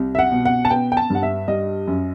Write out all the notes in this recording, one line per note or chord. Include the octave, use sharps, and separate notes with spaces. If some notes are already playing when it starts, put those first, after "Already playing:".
Already playing: C2
E5
F#5
B2
F#5
A5
B3 G5
G5
A5
G2 F#5
E5
G3 D#5
F#2